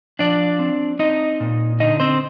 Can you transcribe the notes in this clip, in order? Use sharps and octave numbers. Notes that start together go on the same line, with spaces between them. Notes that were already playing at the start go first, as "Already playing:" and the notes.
F3 D4 D5
C4
C4 D#4 D#5
A#2
D3 D#4 D#5
C4 C5